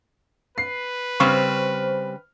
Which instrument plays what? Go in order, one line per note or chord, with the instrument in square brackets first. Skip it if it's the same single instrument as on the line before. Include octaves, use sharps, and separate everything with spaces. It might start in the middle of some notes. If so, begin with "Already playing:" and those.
[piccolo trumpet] B4 [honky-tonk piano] C7
[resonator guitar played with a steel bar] C#3 G3 C4 [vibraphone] C5 [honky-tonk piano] C#6 F6